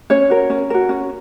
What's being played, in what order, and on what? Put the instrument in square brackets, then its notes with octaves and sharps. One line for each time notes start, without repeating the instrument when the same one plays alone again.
[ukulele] C#4 C#5
F#4 A#4
C#4
F#4 A#4
C#4